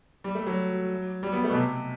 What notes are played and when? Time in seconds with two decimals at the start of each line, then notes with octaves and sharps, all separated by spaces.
0.24 G3
0.35 A3
0.46 F#3
1.23 G3
1.32 B3
1.44 A3
1.50 B2
1.55 C3